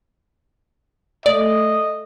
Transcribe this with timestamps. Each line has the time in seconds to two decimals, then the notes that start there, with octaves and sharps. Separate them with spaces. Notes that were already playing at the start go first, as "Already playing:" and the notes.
1.26 A3 D5 D#5